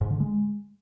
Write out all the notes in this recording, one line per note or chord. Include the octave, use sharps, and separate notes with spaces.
G#2
D3
G#3